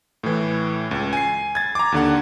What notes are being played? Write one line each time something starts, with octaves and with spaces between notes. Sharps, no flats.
A2 E3
C#2
G#5 C7
G#6 A6
A#5 D6
D#2 D3 F#5